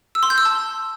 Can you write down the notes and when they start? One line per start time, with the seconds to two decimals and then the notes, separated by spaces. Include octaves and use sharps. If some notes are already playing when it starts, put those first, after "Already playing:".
0.15 E6
0.23 C6
0.30 G6
0.38 E6
0.45 A5